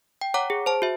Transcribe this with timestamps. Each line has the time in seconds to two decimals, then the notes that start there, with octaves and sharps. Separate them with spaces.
0.21 G5
0.34 C#5 F#5 A#5 D6
0.50 G#4
0.66 C5 A5
0.82 F#4 E5